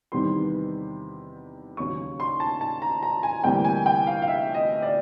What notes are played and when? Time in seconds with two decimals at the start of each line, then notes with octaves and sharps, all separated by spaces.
0.12 E2 C3 D#3 G3 B3 C6
1.77 D#2 C#3 F#3 C#6
2.20 C6
2.40 A5
2.61 A5
2.82 A#5
3.03 A#5
3.23 G#5
3.44 D2 C3 E3 G3 A#3 G5
3.64 G#5
3.86 G5
4.07 F5
4.22 F5
4.27 E5
4.54 D#5
4.82 D5